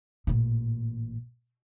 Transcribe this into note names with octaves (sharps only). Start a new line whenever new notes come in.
A1 A#2